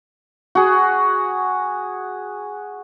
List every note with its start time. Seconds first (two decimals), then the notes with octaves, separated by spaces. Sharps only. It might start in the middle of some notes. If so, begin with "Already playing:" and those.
0.55 F#4 G#4